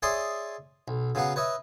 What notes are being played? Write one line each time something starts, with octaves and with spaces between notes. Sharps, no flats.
G#4 C#5 D5 E5 C6 D#6
B1
C#3 F#3 B3 F5 F#5
B4 C#5 D#5 E5